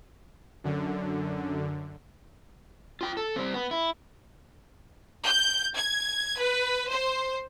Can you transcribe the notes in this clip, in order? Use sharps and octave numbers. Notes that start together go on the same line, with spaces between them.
F#2 D3
F4 G5
A4
G3 C4
B3
E4
G6
G#6
B4
C5